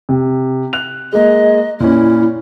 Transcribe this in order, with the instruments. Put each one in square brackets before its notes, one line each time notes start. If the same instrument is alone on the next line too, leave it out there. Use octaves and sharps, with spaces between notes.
[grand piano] C3
F#6 F7
[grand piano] G#3 A#3 [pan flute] D#5
[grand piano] A#2 C#4 [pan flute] E4